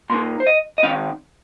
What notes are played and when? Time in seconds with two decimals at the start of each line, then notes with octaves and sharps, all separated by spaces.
0.10 A#2 A#3 D#4 C6
0.40 C5
0.47 D#5
0.78 D#5
0.83 D#3 C4 D#4 F5